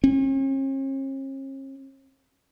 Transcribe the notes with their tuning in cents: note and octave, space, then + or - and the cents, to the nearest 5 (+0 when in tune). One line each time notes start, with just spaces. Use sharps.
C#4 -45